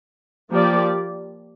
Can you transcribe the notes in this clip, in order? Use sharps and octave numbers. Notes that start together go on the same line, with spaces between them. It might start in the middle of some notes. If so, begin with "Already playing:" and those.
F3 A#3 G4 D5